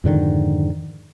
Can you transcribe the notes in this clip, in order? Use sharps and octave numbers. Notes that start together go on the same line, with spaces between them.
F2 G#2 D3 D#3